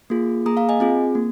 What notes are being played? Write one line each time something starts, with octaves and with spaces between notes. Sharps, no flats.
A#3 F4 G#4
A#3 G#4 A#5 D#6
F5 A#5
D#5 G#5
C4 F4 G#4
A#3